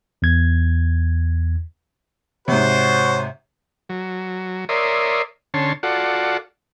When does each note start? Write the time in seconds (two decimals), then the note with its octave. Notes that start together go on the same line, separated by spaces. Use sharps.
0.22 E2 G#6
2.48 G#2 C3 F#4 C5 C#5
3.89 F#3
4.69 A#4 C#5 D5 E5 C6 D#6
5.54 D3 C#4 C#5 A5 C6
5.83 F4 F#4 A4 D5 F#5